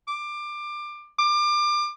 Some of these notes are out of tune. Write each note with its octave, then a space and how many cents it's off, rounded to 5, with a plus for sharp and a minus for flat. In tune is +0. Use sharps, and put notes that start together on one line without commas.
D6 +20
D6 +30